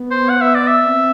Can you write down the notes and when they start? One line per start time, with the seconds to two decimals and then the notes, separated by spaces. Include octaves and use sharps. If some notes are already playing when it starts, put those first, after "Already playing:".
Already playing: B3
0.11 C5
0.30 F#5
0.42 E5
0.55 D5
0.68 E5
0.84 C4